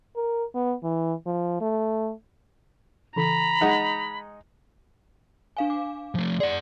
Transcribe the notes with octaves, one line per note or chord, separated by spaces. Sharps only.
A#4
B3
E3
F3
A3
C#3 E3 A4 A#5 B5
G#3 D#4 F#5
D4 F5 G#5
D6
F3 A3
G#4 D5 F#5